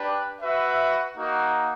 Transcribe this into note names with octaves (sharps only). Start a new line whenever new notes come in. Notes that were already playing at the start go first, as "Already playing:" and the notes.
Already playing: D4 G4 B4 D5
F#4 B4 E5
A#3 D#4 F#4